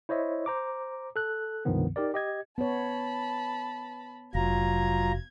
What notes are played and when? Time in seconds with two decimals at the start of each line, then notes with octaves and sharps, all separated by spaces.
0.09 E4 C5 C#5 D#5 E5
0.46 C5 A#5 D6
1.16 A4 F#6
1.65 C#2 G2 C3 D#3 F3 B3
1.96 D#4 G4 A#4 D5
2.14 G4 D#5 G#6
2.58 B3 C#5 A5 B5
4.35 F1 F#3 F4 A#5 G#6